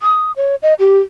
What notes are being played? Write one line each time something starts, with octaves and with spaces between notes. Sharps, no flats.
D#6
C#5
D#5
G4